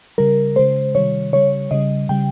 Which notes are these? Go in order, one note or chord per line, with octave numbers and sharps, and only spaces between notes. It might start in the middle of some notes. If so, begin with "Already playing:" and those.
C#3 G3 A#4
C#3 G#3 C5
C3 D#3 G3 C#5
C#3 G3 C#5
C#3 G3 D#5
C#3 G3 G5